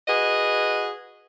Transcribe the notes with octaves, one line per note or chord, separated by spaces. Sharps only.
F#4 G#4 B4 D#5